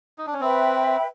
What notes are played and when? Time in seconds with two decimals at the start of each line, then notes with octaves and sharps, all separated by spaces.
0.18 D#4
0.27 D4
0.33 C#4
0.41 C4 B4 E5 G5 B5